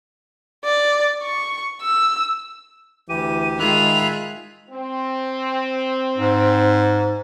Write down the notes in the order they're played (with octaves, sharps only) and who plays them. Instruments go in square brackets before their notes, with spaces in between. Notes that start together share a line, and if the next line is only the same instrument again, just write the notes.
[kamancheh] D5
C#6
E6
[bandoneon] D2 G4 [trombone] E3 [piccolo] D#7
[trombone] D#3 [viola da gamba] G#3 F4 G#4 [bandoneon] E5 B5 F#6 [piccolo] F7
[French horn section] C4
[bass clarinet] G#2